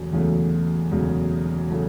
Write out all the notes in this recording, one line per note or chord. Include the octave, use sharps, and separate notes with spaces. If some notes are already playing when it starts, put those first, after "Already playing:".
Already playing: E1 E2 C#3 F#3 A3
E1 E2 C#3 F#3 A3
E1 E2 C#3 F#3 A3
C#3 F#3 A3